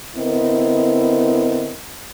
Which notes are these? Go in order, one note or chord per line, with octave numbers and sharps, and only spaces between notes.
D3 B3 C4 E4 A#4 D#5